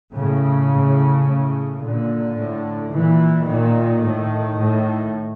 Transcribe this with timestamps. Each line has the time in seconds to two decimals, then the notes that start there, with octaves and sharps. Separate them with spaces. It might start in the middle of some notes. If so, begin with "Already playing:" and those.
0.15 A2 C#3
0.70 A2
1.26 A2
1.81 A#2 D3
2.36 A2
2.92 A#2 E3
3.47 A#2 D#3
4.03 A2
4.57 A2